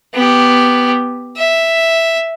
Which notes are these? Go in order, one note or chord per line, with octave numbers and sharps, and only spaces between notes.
B3 G4
E5